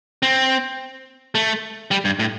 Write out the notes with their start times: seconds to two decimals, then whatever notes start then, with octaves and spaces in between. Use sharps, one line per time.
0.23 C4
1.35 A3
1.91 G3
2.05 G2
2.19 A2